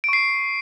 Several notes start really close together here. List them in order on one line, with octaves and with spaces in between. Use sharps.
D7 C#6 C7